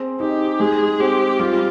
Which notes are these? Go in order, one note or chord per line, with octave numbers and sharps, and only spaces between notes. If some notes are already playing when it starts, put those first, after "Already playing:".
Already playing: C4 G#4
D#4 G4
G#3 G#4
C4 G4
G3 F4